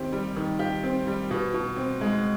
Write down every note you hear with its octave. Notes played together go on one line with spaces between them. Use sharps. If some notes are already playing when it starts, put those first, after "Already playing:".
Already playing: D#3 C4 G4
G3
D#3
G4
C4
G3
B2
B2
C4
G#3